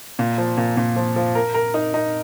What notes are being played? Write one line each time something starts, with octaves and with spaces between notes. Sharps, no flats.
A#2
F3
A#2
A#2
F3
F3
A#4
A#4
D#4
D#4